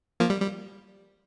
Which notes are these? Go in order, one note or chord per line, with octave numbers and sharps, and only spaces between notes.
F3 A#3
G3
G3